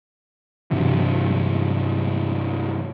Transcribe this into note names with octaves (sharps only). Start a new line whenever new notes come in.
G2 C3 E3 F#3